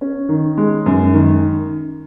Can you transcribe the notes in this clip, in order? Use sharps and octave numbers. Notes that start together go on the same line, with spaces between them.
C#4
D#3
G#3
F#2
D#3